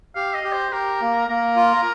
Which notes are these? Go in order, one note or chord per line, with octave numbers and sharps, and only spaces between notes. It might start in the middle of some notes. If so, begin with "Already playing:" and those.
G4 F5
D#5
G4
C5
G4 A#4
A#3
A#3 A#4
F4